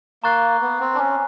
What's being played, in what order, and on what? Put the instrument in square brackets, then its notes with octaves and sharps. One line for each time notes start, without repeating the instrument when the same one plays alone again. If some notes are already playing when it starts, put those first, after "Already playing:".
[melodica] A#3 [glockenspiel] A#5 C#6 F#6 A6 C7
[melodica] B3
C4
D4
C#4